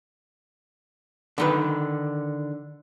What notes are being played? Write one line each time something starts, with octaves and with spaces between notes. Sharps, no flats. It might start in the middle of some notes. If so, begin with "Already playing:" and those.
D3 D#3 B4